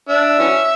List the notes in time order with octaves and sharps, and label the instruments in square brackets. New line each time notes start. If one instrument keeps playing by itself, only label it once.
[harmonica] D4 [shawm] E5
[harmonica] E3 F#3 C#4